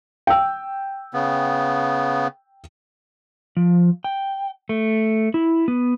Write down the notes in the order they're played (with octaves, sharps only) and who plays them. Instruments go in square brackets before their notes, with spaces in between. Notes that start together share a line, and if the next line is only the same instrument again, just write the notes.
[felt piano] G5 E6
[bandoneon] C#3 B3
[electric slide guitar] F3
G5
A3
E4
B3